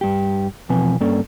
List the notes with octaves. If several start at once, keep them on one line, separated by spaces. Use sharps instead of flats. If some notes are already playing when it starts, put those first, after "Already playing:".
G2 G4
E2 B2 F3 C4 B4 G#5
G2 A#3 C#4 A4 D5